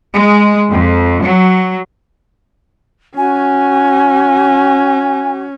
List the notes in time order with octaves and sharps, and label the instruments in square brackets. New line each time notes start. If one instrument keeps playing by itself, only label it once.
[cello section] G#3
F2
F#3
[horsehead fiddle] C#4 [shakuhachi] F#4 [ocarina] G#5